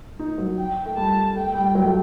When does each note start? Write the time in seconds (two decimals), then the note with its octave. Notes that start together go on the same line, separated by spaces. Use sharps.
0.19 D#4
0.38 F#3
0.58 G5
0.86 A3
0.97 G3 A5
1.35 A3 G5
1.55 G3
1.75 F#3
1.86 A3